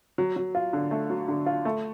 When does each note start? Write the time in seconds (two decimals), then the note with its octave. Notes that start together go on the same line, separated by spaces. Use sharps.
0.18 F#3
0.36 F#3
0.55 F4
0.73 D3
0.91 A3
1.10 F#3
1.28 D3
1.46 F4
1.65 A3